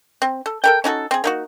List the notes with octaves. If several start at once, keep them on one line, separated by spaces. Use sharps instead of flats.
C4
A4
A4 A#4 G5
C#4 D#4 F#4 A4
C4 G#4
A#3 D#4 F#4